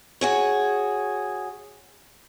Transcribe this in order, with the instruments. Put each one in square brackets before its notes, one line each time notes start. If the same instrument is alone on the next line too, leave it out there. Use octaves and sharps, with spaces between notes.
[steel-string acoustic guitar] F#4 G#4 C#5